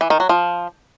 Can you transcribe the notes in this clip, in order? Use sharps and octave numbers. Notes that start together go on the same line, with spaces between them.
E3
D#3
F#3
F3